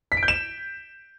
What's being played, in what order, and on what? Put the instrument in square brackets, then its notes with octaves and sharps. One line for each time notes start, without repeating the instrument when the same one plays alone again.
[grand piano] B6
D7
G6
E7